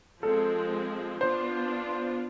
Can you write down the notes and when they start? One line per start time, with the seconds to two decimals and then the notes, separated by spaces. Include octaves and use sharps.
0.23 F3 G#3 C4 A4
1.21 B3 D4 F4 C5